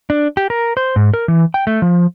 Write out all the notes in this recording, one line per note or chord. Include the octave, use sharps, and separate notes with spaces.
D4
G4
A#4
C5
G#2
A#4
E3
G5
A3
F3